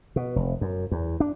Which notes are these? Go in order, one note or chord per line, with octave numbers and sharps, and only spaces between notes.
B2
F1
F#2
E2
D4